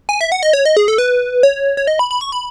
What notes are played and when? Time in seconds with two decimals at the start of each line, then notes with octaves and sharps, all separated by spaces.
0.09 G#5
0.21 E5
0.32 F#5
0.43 D#5
0.53 C#5
0.66 D#5
0.77 G#4
0.88 A4
0.98 B4
1.43 C#5
1.77 C#5
1.87 D#5
1.99 B5
2.11 B5
2.21 C#6
2.32 B5